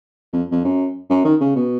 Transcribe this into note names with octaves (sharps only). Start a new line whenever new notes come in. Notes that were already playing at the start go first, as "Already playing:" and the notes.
F2
F2
F#2
F#2
D#3
C#3
B2